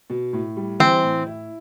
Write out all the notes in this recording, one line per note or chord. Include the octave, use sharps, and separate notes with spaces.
B2
A2
G3
E3 C4
A2
E4